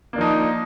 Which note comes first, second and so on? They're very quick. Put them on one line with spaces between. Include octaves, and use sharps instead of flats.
A#3 D4 F3 D#4